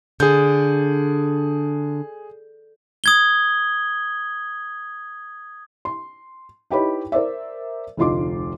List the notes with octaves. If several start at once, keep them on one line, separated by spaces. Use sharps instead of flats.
D3 G#4 G6
D#6 G#6 G7
C6
D#4 E4 G4 B4 C#5 B5
A#4 C5 D5 E5
F1 D2 D#4 F4 C6 D6